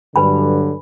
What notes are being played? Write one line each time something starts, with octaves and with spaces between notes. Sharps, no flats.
G2 D3 F#3 B4 G#5 B5